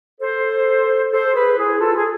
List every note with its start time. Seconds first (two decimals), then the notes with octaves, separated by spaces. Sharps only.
0.20 A4 C5
1.12 A4 C5
1.34 G#4 B4
1.58 E4 G#4
1.80 F4 A4
1.95 G#4